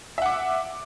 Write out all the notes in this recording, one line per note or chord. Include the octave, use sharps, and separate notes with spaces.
E5 F#5 D6